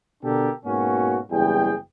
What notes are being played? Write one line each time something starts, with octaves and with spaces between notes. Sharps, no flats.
B2 D3 D4 G4 A4 A#4
G#2 B2 A#3 C#4 F#4
F#1 E2 G3 G#4 G5